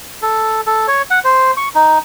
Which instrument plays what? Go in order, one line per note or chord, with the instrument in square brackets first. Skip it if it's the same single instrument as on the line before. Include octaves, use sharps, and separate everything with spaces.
[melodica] A4
A4
C#5
F#5
C5
C#6
D#4